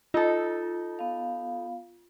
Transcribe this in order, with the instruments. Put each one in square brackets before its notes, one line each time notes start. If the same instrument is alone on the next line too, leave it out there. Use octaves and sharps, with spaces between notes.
[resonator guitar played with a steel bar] D#4 A4 [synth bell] F4
[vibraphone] B3 F5